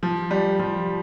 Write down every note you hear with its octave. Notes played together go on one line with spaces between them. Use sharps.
F3
G3
F3